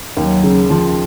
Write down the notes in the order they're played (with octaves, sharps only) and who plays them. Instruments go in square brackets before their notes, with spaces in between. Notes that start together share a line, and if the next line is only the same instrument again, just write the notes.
[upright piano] D#2 [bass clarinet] F#3
[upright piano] C#3
F3